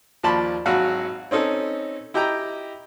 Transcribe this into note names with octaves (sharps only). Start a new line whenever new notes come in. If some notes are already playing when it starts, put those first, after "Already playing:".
D#2 F3 D5 A5 B5 C6
G#1 F#3 F#4 F5 F#5 B5
C4 C#4 D#4 A4
E4 G4 D#5 G5 A#5